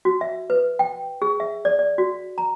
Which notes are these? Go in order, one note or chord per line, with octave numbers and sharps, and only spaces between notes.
F#4
E5
B4
G5
G#4
E5
D5
D5
F#4
A#5